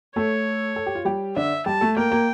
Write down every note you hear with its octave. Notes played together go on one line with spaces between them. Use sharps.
A3 A4 C#5
A4
G4
F4
G3 G4
D3 D4 E5
G3 G4 A5
A3 A4
A#3 A#4 G5
A#3 A#4